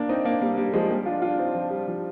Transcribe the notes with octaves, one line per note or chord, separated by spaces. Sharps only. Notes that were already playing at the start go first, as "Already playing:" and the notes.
Already playing: A#3 D4
C4 D#4
A#3 D4
G3 A#3
G3 A#3
F3 G#3
G3 A#3
D4 F4
D4 F4
C4 D#4
F3
G3
F3